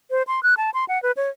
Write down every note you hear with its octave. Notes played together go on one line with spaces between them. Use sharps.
C5
C6
F#6
A5
C6
F#5
B4
C#5